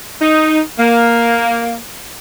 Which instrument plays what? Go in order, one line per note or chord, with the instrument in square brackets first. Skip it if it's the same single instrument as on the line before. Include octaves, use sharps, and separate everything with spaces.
[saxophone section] D#4
A#3